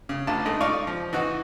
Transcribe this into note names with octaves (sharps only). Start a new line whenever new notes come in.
C#3
A1 D3 F4 A5
G#2 G#3 A3
D#4 F4 D5 F5 C#6
F3
E3 D#4 F#4